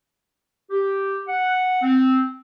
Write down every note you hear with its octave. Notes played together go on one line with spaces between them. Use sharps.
G4
F#5
C4